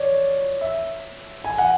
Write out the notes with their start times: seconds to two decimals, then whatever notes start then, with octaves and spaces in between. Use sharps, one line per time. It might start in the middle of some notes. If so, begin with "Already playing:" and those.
Already playing: C#5 D5
0.61 E5
1.44 G#5
1.58 F#5